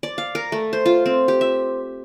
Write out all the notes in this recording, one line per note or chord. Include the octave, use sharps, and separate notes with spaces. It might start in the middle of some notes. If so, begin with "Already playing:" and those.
D5
F5
A#4
A3
C5
F4
C4
G4
E5